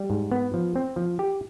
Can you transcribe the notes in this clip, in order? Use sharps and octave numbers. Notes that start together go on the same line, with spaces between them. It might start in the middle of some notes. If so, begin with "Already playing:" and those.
Already playing: G3
G#2
B3
F3
C4
F3
G4